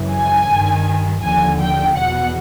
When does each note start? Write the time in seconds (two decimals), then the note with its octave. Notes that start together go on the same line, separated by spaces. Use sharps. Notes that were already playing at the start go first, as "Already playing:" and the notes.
Already playing: F#2 C#3 E3
0.12 G#5
0.49 G2 D#3
1.23 D#2 D3 F3 G#5
1.60 G5
1.97 E2 B2 F#5